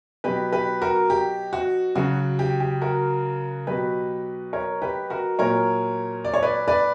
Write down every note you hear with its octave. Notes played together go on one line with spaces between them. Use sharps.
B2 F#3 G4 B4
G4 B4
F#4 A#4
G4
F#4
C#3 F#3 F#4
G4
G4
F#4 A#4
B2 F#3 G4 B4
A#4 C#5
G4 B4
F#4 A#4
A#2 F#3 A#4 C#5
D5
C#5
B4 D5
B4 D5